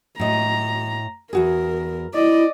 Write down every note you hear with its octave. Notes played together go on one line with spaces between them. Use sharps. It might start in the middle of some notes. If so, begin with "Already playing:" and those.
A2 D#5 A#5
E2 F#4 G#4 A#4
E4 D5 D#5